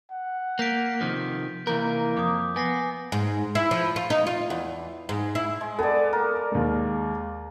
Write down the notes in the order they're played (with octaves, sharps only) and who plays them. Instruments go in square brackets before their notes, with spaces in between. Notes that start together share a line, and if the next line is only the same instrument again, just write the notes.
[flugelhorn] F#5
[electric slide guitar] A#3 [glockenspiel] G6 B6 D7
[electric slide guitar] C3 D#3 F3
[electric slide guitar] C3 E3 A#4 [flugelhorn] A#3 [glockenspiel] G6
[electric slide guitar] F2 [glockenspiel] D6 D#6
[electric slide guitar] B3 [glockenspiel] G#5 A#6 C7
[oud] G#2
E4
F3
F4
D#4
F4
E2
G#2
E4
[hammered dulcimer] G#3
[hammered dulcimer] B3 D5 [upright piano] A4
[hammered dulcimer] A#3 A#4
[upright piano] D#2 G#3